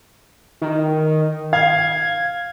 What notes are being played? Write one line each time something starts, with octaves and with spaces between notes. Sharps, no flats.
D#3
F5 G#6